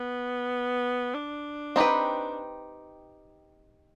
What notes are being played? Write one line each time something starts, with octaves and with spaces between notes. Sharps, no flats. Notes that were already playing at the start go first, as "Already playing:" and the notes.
Already playing: B3
D4
C4 D#4 G4 B4